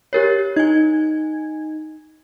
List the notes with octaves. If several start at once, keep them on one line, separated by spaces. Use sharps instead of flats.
G4 A#4 C#5
D#4 G#5 G#6